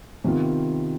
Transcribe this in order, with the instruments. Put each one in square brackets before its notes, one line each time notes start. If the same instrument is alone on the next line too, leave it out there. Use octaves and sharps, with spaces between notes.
[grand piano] C3 D#3 B3 F4